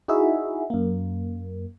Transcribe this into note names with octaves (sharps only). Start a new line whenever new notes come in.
D#4 E4 F#4 G#4 E5
F#2 A#3